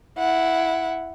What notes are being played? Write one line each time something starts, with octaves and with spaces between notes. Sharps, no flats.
E4 F#5